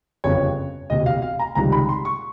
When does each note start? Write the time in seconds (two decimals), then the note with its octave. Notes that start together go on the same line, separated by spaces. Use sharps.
0.24 G1 F2 C#3 C#5
0.90 E1 D2 C3 D#5
1.06 F5
1.22 F5
1.39 A#5
1.55 C#2 C3 D#3 G3 A#5
1.72 B5
1.89 C6
2.05 C#6